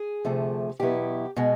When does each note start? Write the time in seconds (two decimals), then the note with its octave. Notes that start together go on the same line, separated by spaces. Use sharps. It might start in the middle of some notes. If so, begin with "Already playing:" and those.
Already playing: G#4
0.25 D2 C3 F3 A3
0.79 E2 B2 F#3 B3 E4 G4
1.36 B2 G#3